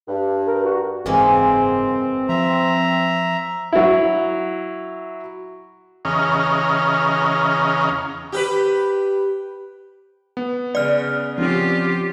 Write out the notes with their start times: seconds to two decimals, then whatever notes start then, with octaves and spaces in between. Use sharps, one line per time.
0.08 G2
0.47 A#4
0.64 F#4
1.06 F#1 G#2 E3 G#3 A#3 C4
2.29 F3 E5 A#5
3.73 F#3 E4
6.05 E2 C#3 C#4 D#5 A#5 F6
8.32 G4 A#4 B4
10.37 B3
10.75 C#3 D5 F6
11.38 F3 C4 C#4 F4 G4